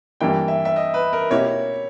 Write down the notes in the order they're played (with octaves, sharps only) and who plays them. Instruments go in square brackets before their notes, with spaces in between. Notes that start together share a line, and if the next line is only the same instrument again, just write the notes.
[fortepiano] G2 E3 A#3 E4 [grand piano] G5
[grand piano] E5
E5
D#5
B4
A#4
[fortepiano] B2 A#3 E4 G4 A#4 [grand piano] C#5